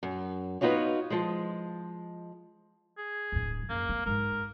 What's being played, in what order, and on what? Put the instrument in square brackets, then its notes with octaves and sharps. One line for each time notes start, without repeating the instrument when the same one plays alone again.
[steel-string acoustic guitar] F#2
B3 D#4 F4 F#4 C#5
F3 G#3
[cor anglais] G#4
[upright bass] D1 A2
[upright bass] F#2 [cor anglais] A#3
[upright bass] G3 C4
[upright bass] G#2 G#3 [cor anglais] A#4